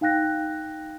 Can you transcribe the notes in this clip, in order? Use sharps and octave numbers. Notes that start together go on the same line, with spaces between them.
D#4 F5 G5 F#6 A#6